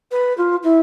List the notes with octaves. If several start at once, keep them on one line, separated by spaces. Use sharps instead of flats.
B4
F4
E4